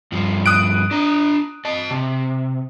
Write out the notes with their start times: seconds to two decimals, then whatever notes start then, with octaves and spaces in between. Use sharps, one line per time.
0.12 G2 F3
0.46 D#6 F#6 D7
0.91 D4 A#5
1.65 D#5 A5
1.91 C3